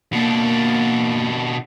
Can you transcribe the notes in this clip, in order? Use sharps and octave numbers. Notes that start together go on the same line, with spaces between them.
B2 A#3 D4